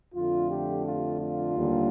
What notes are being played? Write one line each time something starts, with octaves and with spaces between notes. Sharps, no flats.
F2 D3 A3 F4
G4
F4
F4
D#2 D3 G3 A#3